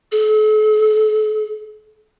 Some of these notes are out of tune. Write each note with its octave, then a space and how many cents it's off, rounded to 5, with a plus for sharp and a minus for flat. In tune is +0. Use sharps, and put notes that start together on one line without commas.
A4 -40